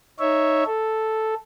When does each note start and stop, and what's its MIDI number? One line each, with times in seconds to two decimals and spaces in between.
0.20 0.64 63
0.20 0.64 73
0.20 0.64 76
0.66 1.34 69